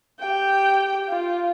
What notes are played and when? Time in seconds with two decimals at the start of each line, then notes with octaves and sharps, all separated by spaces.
0.19 G4 G5
1.09 F4